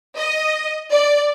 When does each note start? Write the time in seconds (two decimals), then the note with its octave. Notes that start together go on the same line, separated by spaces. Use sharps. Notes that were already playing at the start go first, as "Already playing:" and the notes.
0.17 D#5
0.90 D5